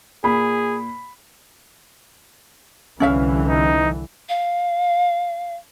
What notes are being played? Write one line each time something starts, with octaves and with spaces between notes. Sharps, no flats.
A#2 G#4 B5
C2 D3 E3 C#4 E5 F5
D#4
F5